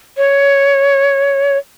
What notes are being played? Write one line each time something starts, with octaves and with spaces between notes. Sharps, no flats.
C#5